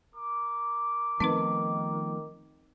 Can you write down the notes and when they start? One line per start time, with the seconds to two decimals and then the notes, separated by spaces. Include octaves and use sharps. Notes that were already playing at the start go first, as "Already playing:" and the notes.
0.14 A#4 D6
1.20 D#3 F3 A3 B3 C4 D#4 B4